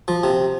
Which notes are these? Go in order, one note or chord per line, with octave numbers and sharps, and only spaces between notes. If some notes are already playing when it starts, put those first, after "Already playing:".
F3
C3